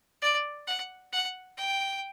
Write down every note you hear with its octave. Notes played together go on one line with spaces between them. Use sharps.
D5
F#5
F#5
G5